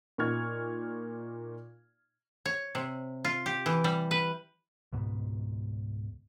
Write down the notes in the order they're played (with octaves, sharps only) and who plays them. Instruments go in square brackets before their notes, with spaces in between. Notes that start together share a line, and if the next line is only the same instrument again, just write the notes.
[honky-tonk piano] A#2 D#4 C#6 F6 G#6
[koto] C#5
C3
F4
G4
E3
G3
B4
[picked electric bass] C#2 G#2 B2